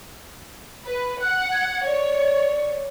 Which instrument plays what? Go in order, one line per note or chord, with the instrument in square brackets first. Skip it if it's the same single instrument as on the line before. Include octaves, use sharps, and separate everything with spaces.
[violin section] B4
[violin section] F#5 [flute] F#6
[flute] G#6
[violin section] C#5 [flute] D5